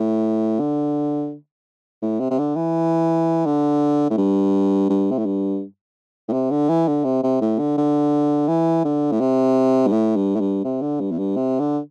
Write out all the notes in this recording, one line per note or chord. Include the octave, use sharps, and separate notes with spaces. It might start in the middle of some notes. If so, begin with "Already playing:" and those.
Already playing: A2
D3
A2
C3
C3
D3
E3
D3
A2
G2
G2
C3
A2
G2
A2
C3
D3
E3
D3
C3
C3
A2
D3
D3
E3
D3
A2
C3
G2
A2
G2
A2
G2
C3
D3
G2
E2
G2
C3
D3